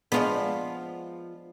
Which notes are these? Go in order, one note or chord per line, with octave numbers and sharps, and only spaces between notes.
F3 G#3 B3 D4 F4 D5